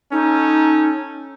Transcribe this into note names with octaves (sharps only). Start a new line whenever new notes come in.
C#4 D#4 A4